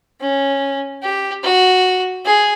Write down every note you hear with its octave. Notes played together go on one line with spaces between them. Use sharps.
C#4
G4
F#4
G#4